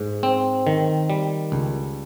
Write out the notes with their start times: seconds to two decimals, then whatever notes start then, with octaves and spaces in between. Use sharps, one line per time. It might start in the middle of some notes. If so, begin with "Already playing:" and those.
Already playing: G#2 G#3
0.23 C4
0.67 D#3
1.10 G3
1.52 C#2